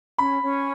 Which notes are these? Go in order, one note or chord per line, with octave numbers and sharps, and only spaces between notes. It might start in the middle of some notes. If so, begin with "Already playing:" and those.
C#4 B5
C#4